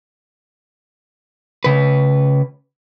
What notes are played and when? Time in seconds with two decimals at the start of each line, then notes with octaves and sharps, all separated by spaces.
1.64 C#3 B4